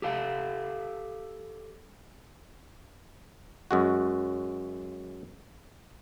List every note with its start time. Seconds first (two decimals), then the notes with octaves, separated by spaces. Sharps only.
0.02 G4 A4 F5
3.71 F#2 G#3 F#4